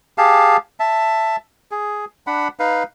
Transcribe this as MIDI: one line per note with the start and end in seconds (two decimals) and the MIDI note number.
0.18 0.57 67
0.18 0.57 68
0.18 0.57 77
0.18 0.57 81
0.80 1.36 76
0.80 1.36 81
1.71 2.05 68
2.27 2.48 62
2.27 2.48 78
2.27 2.48 83
2.59 2.83 63
2.59 2.83 71
2.59 2.83 77